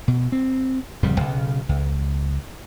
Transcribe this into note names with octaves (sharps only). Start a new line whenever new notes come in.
B2
C4
D1 F2 C#3 G3
B1 C#3
C#2